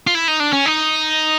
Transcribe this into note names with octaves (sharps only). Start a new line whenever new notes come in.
F4
E4
D#4
D4
C#4
D#4